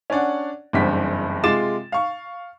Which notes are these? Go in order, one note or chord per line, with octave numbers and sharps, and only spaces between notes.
C#4 D4 D5 F#5
F#1 E2 G2 C4 B6
C3 G#3 F4 D6 A6 E7
F5 C#6